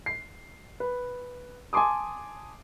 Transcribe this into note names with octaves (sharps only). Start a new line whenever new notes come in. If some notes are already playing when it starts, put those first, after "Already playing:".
C7
B4
G#5 A5 C6 D6 D#6